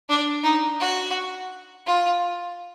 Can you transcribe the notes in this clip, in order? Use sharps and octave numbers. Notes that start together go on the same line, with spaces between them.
D4
D#4
F#4
F4